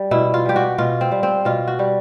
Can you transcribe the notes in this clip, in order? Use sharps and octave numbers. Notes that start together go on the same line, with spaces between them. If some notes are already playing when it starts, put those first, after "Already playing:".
Already playing: G3
B2 E4
F4
G3 G4
F#4
B2 F4
C4
G3
C4
B2 F4
F#4
G3